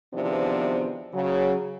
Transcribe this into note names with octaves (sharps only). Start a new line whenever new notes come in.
E2 C3 D#3 F3 B3 D4
C#3 F#3